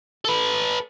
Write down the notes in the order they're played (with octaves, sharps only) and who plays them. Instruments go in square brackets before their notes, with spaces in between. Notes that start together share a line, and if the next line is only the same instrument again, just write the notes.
[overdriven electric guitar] A4 B4